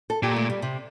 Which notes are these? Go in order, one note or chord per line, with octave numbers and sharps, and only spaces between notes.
A4
A#2 G4
A3
G3
C3